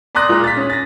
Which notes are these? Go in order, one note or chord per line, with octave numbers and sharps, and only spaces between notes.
D5 A#5 C6 D#6 F#6 A#6
A#2 G#3 F4
A6 B6
C#4
A6 A#6